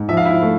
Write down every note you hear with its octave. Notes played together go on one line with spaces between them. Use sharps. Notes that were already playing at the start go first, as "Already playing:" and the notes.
Already playing: G#2
F3 E5
F5
E4 E5
A3